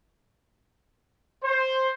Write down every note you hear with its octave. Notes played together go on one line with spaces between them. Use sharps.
C5